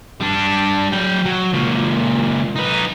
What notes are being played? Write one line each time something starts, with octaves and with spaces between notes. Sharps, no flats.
G3 D4
F#3 G5
F#3
C#2 A#2
D#4 B4